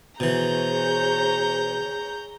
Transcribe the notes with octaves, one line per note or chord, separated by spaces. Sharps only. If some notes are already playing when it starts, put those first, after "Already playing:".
B2 E3 G#4 C5 C#5 A#5 G6